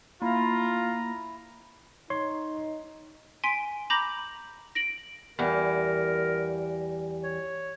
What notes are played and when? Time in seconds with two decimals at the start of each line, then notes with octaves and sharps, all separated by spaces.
0.22 A#3 E4 F4 A#5
2.10 D#4 C#5 C6
3.44 G#5 C6 B6 D7
3.90 A#5 B5 D6 G6 A#6 F#7
4.75 A#6 D7 F#7
5.39 E2 G3 A#4
7.24 C#5